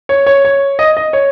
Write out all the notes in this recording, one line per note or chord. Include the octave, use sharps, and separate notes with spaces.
C#5
C#5
C#5
D#5
D#5
C#5